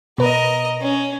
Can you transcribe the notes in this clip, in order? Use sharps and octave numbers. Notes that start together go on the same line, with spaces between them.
B2 A#4 B4 D#5
C#4